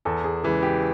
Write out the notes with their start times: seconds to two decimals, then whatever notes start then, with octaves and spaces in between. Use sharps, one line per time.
0.05 E2 A4
0.24 G#4
0.43 C#3 E3 G#3 G#4
0.63 G4